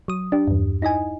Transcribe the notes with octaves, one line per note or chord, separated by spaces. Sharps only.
F#3 D#6
D4 G4
E2 G2
D#4 E4 D#5 G#5